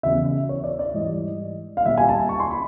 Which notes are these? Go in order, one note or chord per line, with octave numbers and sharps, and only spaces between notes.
E2 C#3 F#3 E5
C#5
D5
D5
G#2 E3 G3 D#5
F5
A#2 G3 E5
G#5
A5
C#6
C6
B5